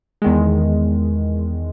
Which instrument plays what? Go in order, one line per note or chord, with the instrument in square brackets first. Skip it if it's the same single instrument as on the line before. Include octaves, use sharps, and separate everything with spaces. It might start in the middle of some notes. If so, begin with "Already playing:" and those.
[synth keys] E2 D#3 G#3